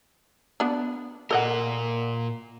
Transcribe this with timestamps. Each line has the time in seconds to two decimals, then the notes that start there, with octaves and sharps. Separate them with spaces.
0.60 B3 D4
1.31 A#2 A4 A#4 D#5 F#5